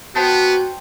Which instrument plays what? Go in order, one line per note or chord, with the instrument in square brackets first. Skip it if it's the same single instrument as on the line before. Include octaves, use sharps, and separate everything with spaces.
[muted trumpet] B3 [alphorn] F#4 [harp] C5 G5 A5